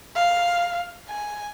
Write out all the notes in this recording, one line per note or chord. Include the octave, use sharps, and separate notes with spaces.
F5
G#5